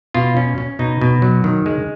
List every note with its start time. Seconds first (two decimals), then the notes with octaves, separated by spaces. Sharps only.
0.14 B2 F4
0.37 C#4
0.58 C#4
0.79 B2 D#4
1.01 B2
1.22 F#3
1.44 D#3
1.66 G#3